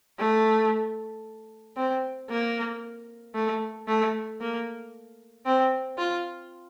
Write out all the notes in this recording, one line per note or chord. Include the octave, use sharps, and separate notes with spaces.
A3
C4
A#3
A3
A3
A#3
C4
F4